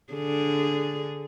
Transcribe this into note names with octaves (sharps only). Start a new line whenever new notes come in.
D3 G#4